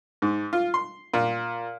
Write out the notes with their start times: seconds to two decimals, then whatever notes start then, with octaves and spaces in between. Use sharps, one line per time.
0.22 G#2
0.53 F4
0.74 C6
1.14 A#2